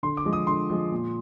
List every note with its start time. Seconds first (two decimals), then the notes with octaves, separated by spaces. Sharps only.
0.03 D3 C6
0.17 D6
0.25 F3 G#3
0.33 D#6
0.47 D3 C6
0.70 F3 G#3
0.91 A#2